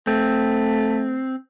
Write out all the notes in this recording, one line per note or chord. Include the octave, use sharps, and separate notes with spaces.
A3 C4